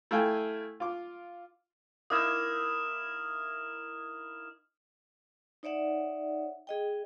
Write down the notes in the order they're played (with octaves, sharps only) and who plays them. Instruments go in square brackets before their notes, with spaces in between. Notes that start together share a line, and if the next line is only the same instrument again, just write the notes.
[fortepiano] A3 E4 F5 G5 G#5
F4 D6
[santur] A#3 D#4 E4 [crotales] D#6 F6 E7
[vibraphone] D#4 C#5 D5 E5 F#5
G#4 D#5 G5